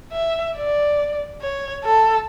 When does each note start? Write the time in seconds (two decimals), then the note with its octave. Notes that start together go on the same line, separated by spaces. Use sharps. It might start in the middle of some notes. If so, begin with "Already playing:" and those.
0.13 E5
0.56 D5
1.41 C#5
1.84 A4